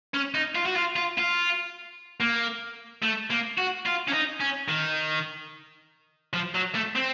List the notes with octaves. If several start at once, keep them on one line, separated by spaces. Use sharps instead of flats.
C#4
D#4
F4
F#4
F4
F4
F4
A#3
A3
A#3
F#4
F4
C#4
D#4
C#4
D#3
F3
F#3
A3
C4